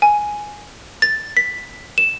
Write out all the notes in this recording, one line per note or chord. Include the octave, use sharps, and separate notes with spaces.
G#5
A6
B6
E7